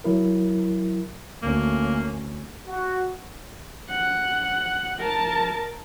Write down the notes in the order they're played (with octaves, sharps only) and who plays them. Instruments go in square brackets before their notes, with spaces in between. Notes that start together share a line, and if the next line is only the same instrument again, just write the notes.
[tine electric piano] F#3 E4 A#4
[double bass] D2 C#4 [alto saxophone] A#3
[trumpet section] F#4
[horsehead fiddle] F#5
A#4 A5